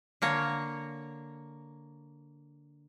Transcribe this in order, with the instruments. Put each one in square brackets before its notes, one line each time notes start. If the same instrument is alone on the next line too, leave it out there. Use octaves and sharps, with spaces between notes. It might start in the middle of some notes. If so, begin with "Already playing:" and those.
[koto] D3 A#3 C#5